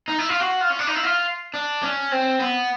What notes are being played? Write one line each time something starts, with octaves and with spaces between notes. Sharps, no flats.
D#4
E4
F4
F#4
F4
C#4
D4
D#4
E4
F4
D4
C#4
C4
B3